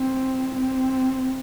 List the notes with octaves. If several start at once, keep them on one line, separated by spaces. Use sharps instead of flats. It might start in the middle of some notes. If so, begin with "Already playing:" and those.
Already playing: C4
C4